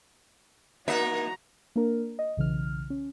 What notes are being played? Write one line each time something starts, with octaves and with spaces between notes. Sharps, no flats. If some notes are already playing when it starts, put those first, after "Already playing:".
A#3 D#4 F#4 E5 A#5
A#3 D4 A#4
D#5
B1 C#3 E3 F6
C#4